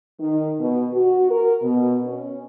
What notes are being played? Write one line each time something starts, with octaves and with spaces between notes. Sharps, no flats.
D#3
B2
F#4
A#4
B2
C#4